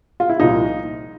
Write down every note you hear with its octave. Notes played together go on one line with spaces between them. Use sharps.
F4
E4
C2 A#2 F3 D#4